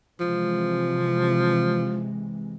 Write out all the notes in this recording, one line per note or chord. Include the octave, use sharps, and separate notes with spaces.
C3 E3 F3 G#3